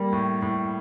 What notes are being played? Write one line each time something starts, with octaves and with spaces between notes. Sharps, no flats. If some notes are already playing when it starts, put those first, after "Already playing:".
Already playing: G3 A#3
A2
A2